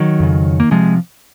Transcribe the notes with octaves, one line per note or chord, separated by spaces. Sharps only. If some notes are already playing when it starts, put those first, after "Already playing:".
Already playing: D#3 F#3
F2 C#3
A#3
C3 F3 G#3